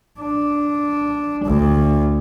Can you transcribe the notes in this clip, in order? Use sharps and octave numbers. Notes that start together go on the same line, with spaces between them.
D4
D2